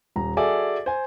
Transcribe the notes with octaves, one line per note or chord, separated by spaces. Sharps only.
D#1 A#5
F#4 G#4 A4 D5 E5 G#5
C5 G#5